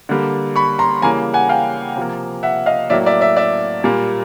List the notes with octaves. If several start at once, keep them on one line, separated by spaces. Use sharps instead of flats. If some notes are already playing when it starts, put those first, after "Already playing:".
D3 G3 A#3
B5 C#6
A#5 C6
C#3 E3 G3 A#3 G#5 A#5
F#5 G#5
F5 G5
C3 F3 A#3
E5 F#5
D#5 F5
A2 F#3 A#3 D5 E5
D5 E5
D5 E5
D5 E5
A#2 G3 A#3